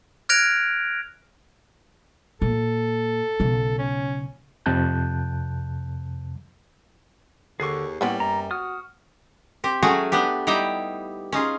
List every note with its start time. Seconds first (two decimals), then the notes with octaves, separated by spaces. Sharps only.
0.29 F6 F#6 G#6 A#6 D7 F7
2.42 A#2 A4
3.40 B1 C#3
3.79 C#4
4.66 F2 C3 A5 F#6 G6
7.60 D#2 D3 G#4 C#6
8.01 A2 G3 A#3 B3 C#4
8.20 F#2 A#5
8.51 F#4 D#6 F6
9.64 C4 G4
9.83 F#3 A3 C#4 F#4 G#4
10.12 B3 D4 G4
10.47 G3 D#4 E4 G4 G5
11.32 C#4 D#4 F4 G#4